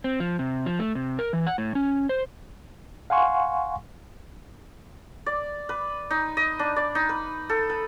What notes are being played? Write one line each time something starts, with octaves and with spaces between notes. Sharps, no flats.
C4
F3
C3
F3
A3
C3
A#4
E3
F#5
A2
C#4
C5
F5 F#5 G#5 C6 C#6
D5
B4
D#4
D#5
D4
D5
D#4
B4
A4
B4